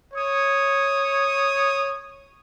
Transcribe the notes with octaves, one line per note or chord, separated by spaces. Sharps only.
C#5 D#6